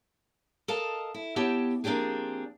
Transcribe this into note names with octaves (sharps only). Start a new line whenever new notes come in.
A4 A#4 D#5 F5 A5
E4
B3 E4 G4 C#5 G5 A5
F3 A#3 C4 D4 G4 G#4